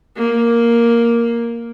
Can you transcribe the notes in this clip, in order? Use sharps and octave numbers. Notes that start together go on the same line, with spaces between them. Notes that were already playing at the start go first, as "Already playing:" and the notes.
A#3